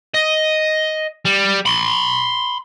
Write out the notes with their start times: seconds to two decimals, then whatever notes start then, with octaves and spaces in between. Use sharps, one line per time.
0.14 D#5
1.25 G3
1.66 B5 C6